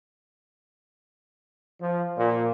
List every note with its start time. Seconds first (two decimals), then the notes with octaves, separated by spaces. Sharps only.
1.80 F3
2.17 A#2